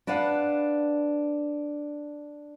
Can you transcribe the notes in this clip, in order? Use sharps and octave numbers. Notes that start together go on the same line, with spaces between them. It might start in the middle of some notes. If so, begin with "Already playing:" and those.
D4 B4 D5 F5 F#5